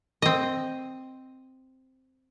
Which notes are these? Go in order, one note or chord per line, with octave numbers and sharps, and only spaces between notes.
C4 D#5